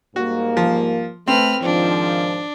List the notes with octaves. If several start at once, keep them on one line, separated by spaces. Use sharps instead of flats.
G#2 G3 A#3 F#4
F3
A3 C4 B4 F6
G#2 D#3 F3 D4